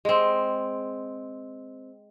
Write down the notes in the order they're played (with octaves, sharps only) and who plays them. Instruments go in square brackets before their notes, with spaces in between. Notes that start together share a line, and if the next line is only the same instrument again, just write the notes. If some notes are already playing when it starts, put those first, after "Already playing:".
[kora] G#3 C4